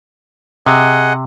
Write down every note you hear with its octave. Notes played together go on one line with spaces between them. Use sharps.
C3 G#4 D#5 F#5